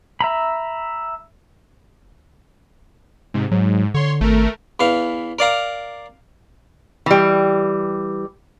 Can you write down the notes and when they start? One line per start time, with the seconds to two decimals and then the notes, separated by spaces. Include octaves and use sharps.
0.21 E5 A#5 B5
3.34 G#2 C3
3.52 G#2 F#3
3.94 D3 C#5 C6
4.21 G#1 A3 A#4
4.80 E2 E3 F5
5.39 A#4 D5 F5 A#5
7.06 E3 G3